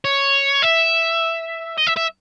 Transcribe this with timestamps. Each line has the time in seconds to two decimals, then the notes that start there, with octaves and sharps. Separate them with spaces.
0.05 C#5
0.63 E5
1.78 D#5
1.87 E5
1.97 E5